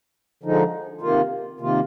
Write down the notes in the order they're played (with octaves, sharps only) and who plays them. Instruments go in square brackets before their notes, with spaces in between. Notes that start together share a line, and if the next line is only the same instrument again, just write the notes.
[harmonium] D3 F3 G#3 D#4
C3 D#3 A#3 F4
C3 D#3 A#3 F4